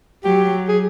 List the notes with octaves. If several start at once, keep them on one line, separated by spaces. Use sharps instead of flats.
F#3 G4
G#4